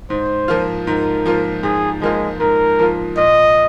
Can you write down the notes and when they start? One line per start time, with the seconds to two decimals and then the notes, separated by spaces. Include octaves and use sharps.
0.10 G#2 C5
0.48 F3 A#3 F4
0.86 G#2 A#4
1.26 F3 A#3 F4
1.63 G#2 G#4
2.02 F3 G#3 A#3 F4
2.40 G#2 A#4
2.79 F3 A#3 F4
3.17 A#2 D#5